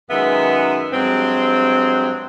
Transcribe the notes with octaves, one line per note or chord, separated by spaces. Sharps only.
F#2 D#3 G#3 B3 G#4 E5
G2 F#3 G#3 C4